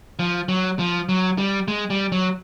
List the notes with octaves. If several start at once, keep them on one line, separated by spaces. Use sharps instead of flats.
F3
F#3
F3
F#3
G3
G#3
G3
F#3